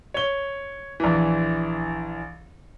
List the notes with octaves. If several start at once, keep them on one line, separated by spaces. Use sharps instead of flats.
C#5 G7
A#1 E3